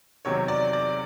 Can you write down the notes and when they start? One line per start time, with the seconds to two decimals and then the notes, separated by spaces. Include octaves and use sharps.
0.25 E2 C3 D#3 F#3 C#5
0.48 D5
0.73 D5